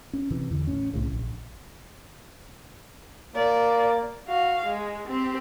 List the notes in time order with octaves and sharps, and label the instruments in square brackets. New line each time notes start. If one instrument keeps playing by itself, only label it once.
[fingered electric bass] C#4
C3 E3
E2 D3 E3
A1 C#4
C2 A2 C#3
A#1
[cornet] A#3 [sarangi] D5
[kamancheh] F#4 F5
G#3
C4 G4